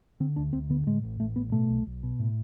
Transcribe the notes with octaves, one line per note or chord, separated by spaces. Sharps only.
D3 C4
D2 D4
D2 C4
D3 B3
A2 G#3
A1
A1 A3
A2 B3
B2 A3
B1
B1
B2
A2